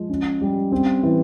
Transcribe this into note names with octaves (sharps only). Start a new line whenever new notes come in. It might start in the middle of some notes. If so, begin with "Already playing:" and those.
Already playing: F3 G#3
C#4
G3
C4
E3